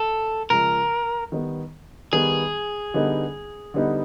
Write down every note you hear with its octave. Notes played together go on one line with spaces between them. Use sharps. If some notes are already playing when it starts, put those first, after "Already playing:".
Already playing: A4
C#3 F3 G#3 A#4
D#3 G3 B3
D#3 G3 B3 G#4
D3 G3 B3 D#4
D3 G3 B3 D#4